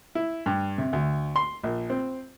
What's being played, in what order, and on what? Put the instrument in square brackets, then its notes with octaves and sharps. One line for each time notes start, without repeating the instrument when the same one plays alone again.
[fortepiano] E4
G2
C3
D2
C6
A#1
C4